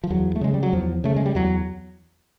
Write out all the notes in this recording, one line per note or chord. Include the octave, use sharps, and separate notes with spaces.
F3
E2 F#3
A3
C#3 G#3
G3
F#3
E2 F3
C#3 A3
G#3
G3
E2 F#3